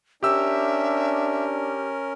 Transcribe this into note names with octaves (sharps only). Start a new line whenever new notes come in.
C#4 D4 G4 A#4 E5 E6